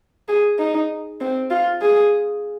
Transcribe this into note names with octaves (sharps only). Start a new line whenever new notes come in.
G#4
D#4
C4
F4
G#4